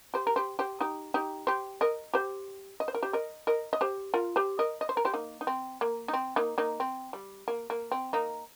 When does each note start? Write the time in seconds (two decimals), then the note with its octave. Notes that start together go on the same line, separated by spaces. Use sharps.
0.14 G4 C5
0.27 A#4
0.36 G4 C5
0.59 G4 C5
0.80 D#4 G4
1.14 D#4 G4
1.47 G4 C5
1.81 A#4 D#5
2.14 G4 C5
2.80 D#5
2.88 C5
2.94 A#4
3.03 G4 C5
3.13 A#4 D#5
3.47 A#4 D#5
3.73 D#5
3.81 G4 C5
4.14 F4 A#4
4.36 G4 C5
4.59 A#4 D#5
4.81 D#5
4.89 C5
4.97 A#4
5.05 G4 C5
5.14 A#3 D#4
5.41 D#4
5.47 C4
5.81 A#3
6.08 D#4
6.13 C4
6.36 A#3 D#4
6.58 A#3 D#4
6.80 C4
7.13 G3
7.48 A#3
7.70 A#3
7.92 C4
8.13 A#3 D#4